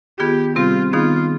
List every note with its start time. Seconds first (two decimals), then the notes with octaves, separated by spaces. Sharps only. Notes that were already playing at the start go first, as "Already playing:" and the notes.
0.19 D#3 B3 F4 G4 G#4
0.56 C3 G3 C4 F4 G4
0.93 D#3 B3 D#4 F4 G#4